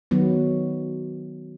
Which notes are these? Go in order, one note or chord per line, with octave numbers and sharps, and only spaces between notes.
D#3 F#3 B3